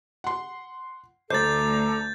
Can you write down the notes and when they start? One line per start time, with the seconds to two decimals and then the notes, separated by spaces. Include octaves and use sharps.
0.24 F#5 C6
1.30 D2 A4 C5 A#5 D6 G6 A6